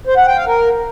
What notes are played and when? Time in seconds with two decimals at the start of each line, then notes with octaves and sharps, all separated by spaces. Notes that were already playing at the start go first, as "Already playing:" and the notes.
0.07 C5
0.17 F#5
0.27 G5
0.37 F5
0.47 A#4